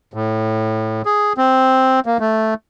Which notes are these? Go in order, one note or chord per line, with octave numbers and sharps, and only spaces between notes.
A2
G#4
C4
A#3
A3